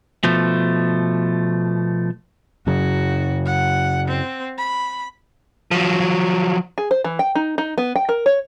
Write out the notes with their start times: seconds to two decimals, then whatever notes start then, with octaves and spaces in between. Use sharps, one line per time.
0.24 B2 F3 A3
2.67 F#2 C#3 F#4
3.46 F#5
4.08 C4
4.58 B5
5.71 F3 F#3
6.78 G#4
6.91 C5
7.04 E3
7.19 G5
7.35 D#4
7.58 D#4
7.78 B3
7.96 G5
8.09 A#4
8.26 C#5